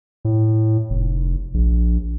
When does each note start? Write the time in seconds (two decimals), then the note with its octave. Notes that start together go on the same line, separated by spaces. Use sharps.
0.25 A2
0.90 F1
1.54 A#1